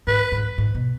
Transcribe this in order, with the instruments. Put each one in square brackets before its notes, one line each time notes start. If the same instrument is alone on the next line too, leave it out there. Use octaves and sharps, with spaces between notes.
[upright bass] G#2 [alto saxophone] B4
[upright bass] G#2
G#2
B2